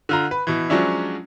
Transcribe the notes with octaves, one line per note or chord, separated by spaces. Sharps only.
D3 F4 A#5
B4
B2 E3
F3 F#3 G#3 C#4 D4 E5